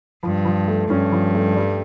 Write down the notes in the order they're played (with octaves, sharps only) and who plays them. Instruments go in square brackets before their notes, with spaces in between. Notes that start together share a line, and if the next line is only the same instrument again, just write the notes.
[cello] G2 [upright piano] F3
[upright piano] F3
A3
[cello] G2 [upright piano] C#4
[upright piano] F3
A3
G3